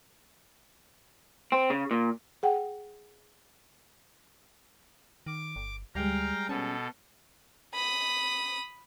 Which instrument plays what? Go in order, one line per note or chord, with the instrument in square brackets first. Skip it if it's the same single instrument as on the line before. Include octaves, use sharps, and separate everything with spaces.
[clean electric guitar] C4
C#3
A#2
[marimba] G#4 F#5 G5
[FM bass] D#3 [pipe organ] D6
[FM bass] G1
[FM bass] D2 [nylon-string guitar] G3 G#3 [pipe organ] F5 G5 A#5
[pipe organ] B2 A4 [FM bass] C#4
[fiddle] B5 D#6